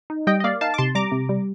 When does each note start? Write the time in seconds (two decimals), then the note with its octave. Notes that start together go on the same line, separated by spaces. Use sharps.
0.10 D#4
0.27 G3 D#5 G5
0.40 D#5
0.44 A#3 D5 F5
0.61 D#4 F5 A5
0.74 D6
0.78 C3 A5 C6
0.95 G3 A#5 D6
1.12 C3
1.29 G3